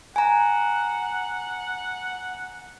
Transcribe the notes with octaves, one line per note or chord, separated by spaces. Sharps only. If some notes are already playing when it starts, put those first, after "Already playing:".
F#5 G#5 A#5